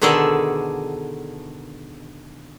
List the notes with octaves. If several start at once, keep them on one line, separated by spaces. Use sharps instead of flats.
B2 D3 D#3 G#4 A4 D5